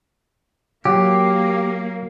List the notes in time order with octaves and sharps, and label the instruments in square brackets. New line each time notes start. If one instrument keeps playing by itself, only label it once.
[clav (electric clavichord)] F#3 [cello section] A#3 [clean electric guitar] G4